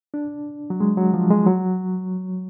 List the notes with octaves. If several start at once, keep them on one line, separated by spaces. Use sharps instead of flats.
D4
F#3
G#3
F#3
F3
G#3
F#3